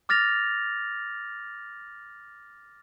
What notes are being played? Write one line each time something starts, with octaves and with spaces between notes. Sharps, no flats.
D6 F6 A6 A#6 F7